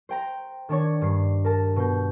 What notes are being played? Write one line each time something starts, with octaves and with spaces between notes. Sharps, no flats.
C5 G5 A#5
D#3 D4 C#5
G2 C7
A#4 A5
B2 G6